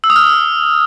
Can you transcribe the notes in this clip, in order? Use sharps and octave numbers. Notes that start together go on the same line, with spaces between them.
E6
D#6
F6